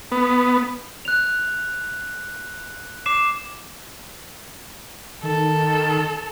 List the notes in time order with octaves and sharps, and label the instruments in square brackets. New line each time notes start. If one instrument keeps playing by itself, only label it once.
[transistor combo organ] B3
[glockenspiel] F#6 F7
D6 C7 E7
[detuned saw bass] D#3 [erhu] A4